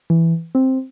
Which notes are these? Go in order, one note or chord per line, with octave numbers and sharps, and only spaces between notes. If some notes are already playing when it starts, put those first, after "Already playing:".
E3
C4